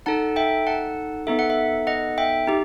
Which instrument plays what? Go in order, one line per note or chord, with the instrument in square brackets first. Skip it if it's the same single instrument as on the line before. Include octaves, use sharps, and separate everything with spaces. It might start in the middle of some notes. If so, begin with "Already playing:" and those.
[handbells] D#4 A4 F#5 A5
E5 G5
F#5 A5
B3 D#4 A4 E5
F#5
E5
D#5 F#5
E5 G5
D#4 G4